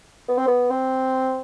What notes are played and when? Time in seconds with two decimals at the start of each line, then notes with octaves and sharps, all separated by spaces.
0.28 B3
0.37 C4
0.47 B3
0.70 C4